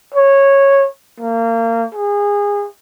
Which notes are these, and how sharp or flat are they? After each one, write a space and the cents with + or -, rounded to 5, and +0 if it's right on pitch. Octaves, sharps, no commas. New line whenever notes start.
C#5 -10
A#3 -30
G#4 -25